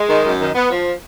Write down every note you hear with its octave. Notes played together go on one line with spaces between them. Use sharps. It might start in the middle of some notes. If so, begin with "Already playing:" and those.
Already playing: G#3
D#3
F#2
D#3
B3
F3